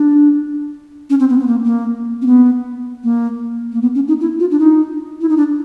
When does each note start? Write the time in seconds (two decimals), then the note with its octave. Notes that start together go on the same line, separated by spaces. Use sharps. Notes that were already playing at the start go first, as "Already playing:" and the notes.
Already playing: D4
1.10 C#4
1.20 C4
1.30 B3
1.40 B3
1.47 A#3
1.64 A#3
2.22 C4
2.26 B3
3.04 A#3
3.72 A#3
3.82 B3
3.95 C#4
4.08 D#4
4.21 E4
4.40 F4
4.51 D4
4.59 D#4
5.21 E4
5.29 D#4
5.37 D4